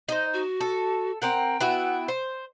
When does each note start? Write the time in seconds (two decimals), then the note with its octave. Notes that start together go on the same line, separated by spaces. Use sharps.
0.09 D#4 C5 D#5
0.33 F#4
0.61 A4
1.22 C4 A#4 F#5 G5
1.60 B3 E4 F#4
2.08 C5